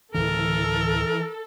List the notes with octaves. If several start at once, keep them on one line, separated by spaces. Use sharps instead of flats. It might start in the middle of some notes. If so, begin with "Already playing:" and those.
D1 C#3 E3 A4 A#4